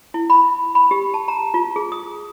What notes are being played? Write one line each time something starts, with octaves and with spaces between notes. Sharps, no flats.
E4
B5
B5
G4
A5
A#5
F4
G#4
D#6